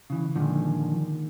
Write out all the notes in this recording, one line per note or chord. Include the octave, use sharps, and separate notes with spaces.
C#3 E3
A#2 D3 D#3 F3 G#3